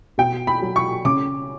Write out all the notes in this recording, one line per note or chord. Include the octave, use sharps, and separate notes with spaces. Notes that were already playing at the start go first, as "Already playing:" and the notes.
B2 G5
B5
F#3
C#6
C#3 D6